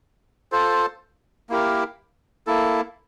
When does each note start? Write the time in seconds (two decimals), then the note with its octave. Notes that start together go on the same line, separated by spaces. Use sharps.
0.52 F4 A4 C5
1.49 A#3 E4 G4 A#4
2.47 A#3 E4 A4